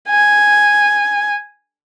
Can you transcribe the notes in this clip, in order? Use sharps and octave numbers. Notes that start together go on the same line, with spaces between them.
G#5